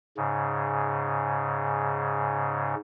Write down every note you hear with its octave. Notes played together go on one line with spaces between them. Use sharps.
G#2 C#3